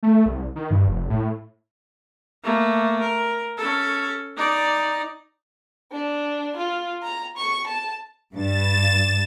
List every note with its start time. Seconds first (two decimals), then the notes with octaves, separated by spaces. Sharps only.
0.03 A3
0.26 C2
0.56 D#3
0.71 G2
0.88 F1
1.10 A2
2.43 A3 A#3
3.00 A#4
3.57 C#4 A4
4.37 D#4 D5
5.93 D4
6.57 F4
7.03 A#5
7.37 C#6
7.67 A5
8.35 G2 A6 E7